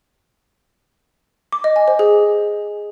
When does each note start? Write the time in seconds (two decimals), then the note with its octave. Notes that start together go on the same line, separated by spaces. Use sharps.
1.52 D6
1.64 D#5
1.76 G#5
1.88 C5
1.99 G#4